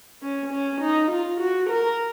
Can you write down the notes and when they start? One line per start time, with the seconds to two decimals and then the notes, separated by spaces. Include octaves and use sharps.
0.23 C#4
0.52 C#4
0.81 D#4
1.11 F4
1.41 F#4
1.70 A#4